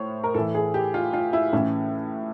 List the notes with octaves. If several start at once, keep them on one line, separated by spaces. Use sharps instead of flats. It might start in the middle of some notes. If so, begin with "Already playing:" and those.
Already playing: A2 C5 C#5
A#4
A2 E3 A4
G#4
G4
F4
F4
E4
A2 E3 C#4